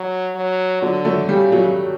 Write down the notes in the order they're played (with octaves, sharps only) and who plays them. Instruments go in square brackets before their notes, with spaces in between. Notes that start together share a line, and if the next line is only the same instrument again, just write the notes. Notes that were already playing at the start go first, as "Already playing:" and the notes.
Already playing: [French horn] F#3
F#3
[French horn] D3 [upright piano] F#3
[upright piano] F#3 A3
[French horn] C#3 [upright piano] G3
[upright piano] F#3